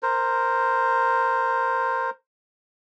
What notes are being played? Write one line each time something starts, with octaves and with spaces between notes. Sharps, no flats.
A#4 C5